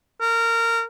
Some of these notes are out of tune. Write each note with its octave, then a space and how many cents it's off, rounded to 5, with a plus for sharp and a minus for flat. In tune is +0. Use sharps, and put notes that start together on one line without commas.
A#4 -20